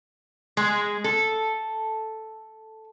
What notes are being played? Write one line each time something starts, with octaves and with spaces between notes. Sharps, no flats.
G#3
A4